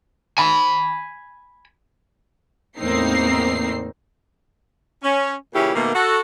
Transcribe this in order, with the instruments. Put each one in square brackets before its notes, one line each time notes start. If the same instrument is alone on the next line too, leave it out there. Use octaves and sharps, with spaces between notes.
[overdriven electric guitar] G#5 B5
[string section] E2 A2 A#3 C4 D#4 C7
[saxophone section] C#4
A#2 C#3 E3 C#4 E4 G4
B2 D#3 A3 A#3
F#4 A4